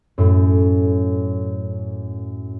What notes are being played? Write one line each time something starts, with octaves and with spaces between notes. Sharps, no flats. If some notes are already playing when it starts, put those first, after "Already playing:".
F#2 A2